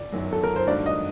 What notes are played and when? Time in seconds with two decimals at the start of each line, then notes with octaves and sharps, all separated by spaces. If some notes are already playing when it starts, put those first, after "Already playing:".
Already playing: D5
0.12 G1 F#2 D#3 F#3
0.33 A4
0.44 A#4
0.56 C5
0.67 G2 D#3 A3 D4 F#4 D5
0.86 D#5